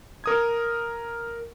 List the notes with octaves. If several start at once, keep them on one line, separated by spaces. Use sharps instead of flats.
A#4 D#6 G#6